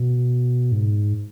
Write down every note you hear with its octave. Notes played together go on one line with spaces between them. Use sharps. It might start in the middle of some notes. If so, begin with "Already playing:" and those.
Already playing: B2
G#2